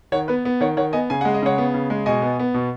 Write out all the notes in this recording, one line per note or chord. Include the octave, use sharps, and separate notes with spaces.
D#3 C#5 F#5
B3 B4
B3
D#3 C#5 F#5
D#3 C#5 F#5
B3 D#5 G#5
C#3 G#5
G#3 F#5
D#5
C#3 C#5 F#5
B3
C#3
G#3
B2 D#5 G#5
B3
B3
B2